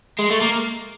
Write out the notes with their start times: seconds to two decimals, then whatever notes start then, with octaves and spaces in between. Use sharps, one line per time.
0.19 G#3
0.31 A3
0.41 A#3